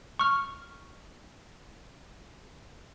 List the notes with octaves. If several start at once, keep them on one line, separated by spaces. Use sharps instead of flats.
C#6 F6